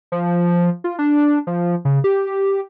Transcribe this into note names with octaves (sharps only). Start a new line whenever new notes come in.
F3
F4
D4
F3
C#3
G4